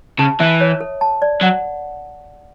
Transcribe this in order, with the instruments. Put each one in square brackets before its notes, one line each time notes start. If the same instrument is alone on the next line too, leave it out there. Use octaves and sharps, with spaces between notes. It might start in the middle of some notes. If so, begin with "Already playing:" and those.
[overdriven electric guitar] C#3 [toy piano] A5
[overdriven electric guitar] E3 [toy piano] E5
[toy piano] C#5
A4
A5
D5
[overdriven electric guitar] F#3 [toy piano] F#5